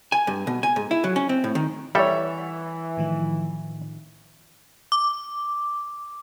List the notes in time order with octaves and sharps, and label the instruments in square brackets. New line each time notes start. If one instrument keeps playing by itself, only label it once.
[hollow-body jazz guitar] G#5
G2
B2
G#5
G#2
E4
F#3
C#4
C4
A2
D#3
[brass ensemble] E3 [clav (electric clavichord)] G3 G4 A4 [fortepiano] C#5 E5 [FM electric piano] F#5
[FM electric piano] A2 D#3 F3
[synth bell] D6